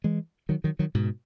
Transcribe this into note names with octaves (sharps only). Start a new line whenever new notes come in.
E3 G#3
D#3 F#3
D#3 F#3
D#3 F#3
G#2 B2